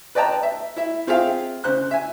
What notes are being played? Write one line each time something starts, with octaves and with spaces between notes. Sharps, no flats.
B4 D5 D#5 G5 A5 A#5
E5
E4 E5
C4 F4 G#4 E5 F5 G5
C#3 C5 F#6
E5 G#5